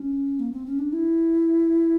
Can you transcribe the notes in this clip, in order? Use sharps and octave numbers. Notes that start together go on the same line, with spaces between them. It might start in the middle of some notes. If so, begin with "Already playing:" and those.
Already playing: C#4
A#3
C4
C#4
D4
E4